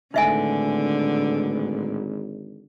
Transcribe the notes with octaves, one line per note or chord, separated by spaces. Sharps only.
G#1 A2 D3 E3 A3 D#4 E5 G#5